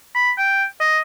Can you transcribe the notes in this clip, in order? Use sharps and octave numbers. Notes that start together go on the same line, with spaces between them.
B5
G5
D#5